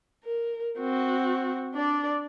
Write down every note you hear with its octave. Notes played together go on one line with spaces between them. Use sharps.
A#4
C4 F#4
D4 D5